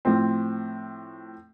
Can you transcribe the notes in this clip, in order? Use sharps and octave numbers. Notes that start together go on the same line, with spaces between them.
A2 F3 C4